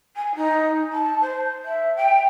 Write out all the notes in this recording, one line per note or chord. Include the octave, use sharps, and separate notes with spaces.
G#5
D#4
A5
C5
E5
G5